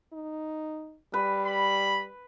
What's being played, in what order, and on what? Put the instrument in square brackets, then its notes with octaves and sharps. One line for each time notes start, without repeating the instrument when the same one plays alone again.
[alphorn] D#4
[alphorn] G3 [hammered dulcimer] B4
[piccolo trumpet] B5